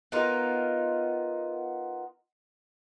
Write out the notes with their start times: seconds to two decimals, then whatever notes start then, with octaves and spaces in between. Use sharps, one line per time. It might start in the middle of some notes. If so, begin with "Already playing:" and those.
0.12 B3 D#4 F4 A#4